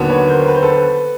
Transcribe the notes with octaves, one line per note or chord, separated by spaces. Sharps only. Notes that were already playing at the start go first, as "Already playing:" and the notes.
Already playing: D#2 D3 F#3 B3
B4 C#5
A#4 C5
B4
C5
A4 B4